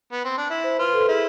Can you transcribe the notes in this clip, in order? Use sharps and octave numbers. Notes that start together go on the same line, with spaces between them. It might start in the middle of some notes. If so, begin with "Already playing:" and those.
B3
C4
D4
E4
C5
F4 B4
B4
A4
E4 G#4